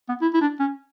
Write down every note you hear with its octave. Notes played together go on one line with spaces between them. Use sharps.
B3
E4
E4
D4
C#4